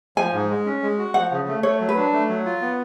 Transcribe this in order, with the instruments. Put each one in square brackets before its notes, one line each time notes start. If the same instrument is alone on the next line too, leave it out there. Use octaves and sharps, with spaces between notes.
[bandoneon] F3 [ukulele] G#5
[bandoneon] G#2
G#3
C#4
G#3
F#4
[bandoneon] F3 [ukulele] F#5
[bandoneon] C#3
A3
[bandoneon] A3 [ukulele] C#5
[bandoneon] F#3
[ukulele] B4
[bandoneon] D4
A3
F#3
F4
B3